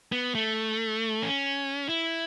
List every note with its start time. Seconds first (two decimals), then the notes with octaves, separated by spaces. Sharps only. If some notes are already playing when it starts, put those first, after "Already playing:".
0.12 B3
0.35 A3
1.22 C#4
1.89 E4